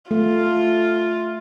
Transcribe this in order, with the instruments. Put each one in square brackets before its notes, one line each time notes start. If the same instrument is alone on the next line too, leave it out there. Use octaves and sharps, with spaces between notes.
[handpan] A3 [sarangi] F4